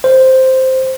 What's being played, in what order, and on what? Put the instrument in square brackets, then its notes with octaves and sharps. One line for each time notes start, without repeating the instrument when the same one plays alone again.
[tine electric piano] C5